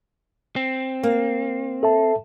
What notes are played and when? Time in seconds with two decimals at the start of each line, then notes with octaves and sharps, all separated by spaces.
0.56 C4
1.03 A#3
1.83 A4 E5 A5